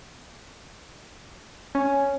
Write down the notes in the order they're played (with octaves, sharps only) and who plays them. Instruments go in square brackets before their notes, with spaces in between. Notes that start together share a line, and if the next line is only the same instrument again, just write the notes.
[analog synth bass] C#4